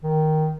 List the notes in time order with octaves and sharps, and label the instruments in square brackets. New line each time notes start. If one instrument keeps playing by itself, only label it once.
[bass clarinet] D#3